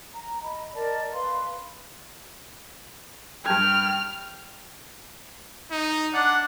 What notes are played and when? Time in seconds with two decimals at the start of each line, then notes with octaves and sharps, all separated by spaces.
0.15 A#5
0.42 D#5 B5
0.74 A#4 D5 D#5 A5
1.13 B4 F5 C6
3.46 G2 G5 A5 F6 G#6
5.71 D#4
6.14 D4 F#5